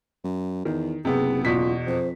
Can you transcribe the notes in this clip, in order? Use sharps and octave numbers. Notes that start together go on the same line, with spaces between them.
F#2
E2 D#3
F#1 C3 B3 G#4
E2 B2 F4 B6
F2 C5